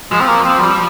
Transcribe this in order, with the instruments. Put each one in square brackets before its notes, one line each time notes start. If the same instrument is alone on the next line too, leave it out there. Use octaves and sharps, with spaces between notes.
[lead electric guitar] F3 [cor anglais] G#3
[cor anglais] C4
A#3
C4
G3